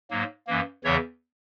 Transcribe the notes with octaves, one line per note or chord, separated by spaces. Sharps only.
G#2 F#3 A#3
F#2 E3 A#3
E2 C#3 E3 C#5 E5